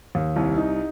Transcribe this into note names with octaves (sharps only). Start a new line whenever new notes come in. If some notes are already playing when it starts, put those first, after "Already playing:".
D#2
C2
D#4